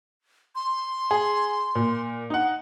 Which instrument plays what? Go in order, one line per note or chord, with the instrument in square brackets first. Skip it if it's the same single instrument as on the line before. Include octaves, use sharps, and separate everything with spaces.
[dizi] C6
[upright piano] G#4
A#2
D#4 F#5